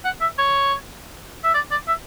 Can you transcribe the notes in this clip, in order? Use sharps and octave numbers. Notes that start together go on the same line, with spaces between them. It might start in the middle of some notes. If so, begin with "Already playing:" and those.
F#5
E5
C#5
E5
D5
D5
E5